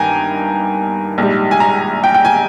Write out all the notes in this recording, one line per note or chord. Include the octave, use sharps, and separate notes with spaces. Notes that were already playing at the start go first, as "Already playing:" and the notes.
Already playing: G2 D#3 A#3 G5 G#5 A#5
A#1 G#2 G3
G#5
A#5
G5
G5
G#5